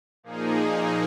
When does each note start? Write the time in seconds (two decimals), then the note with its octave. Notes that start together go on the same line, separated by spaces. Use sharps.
0.23 A#2 F3 A#3 D#4 G#4